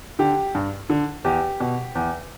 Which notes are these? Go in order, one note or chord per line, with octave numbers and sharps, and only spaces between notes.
D3 G4
G2
D3
E2 G4
B2
E2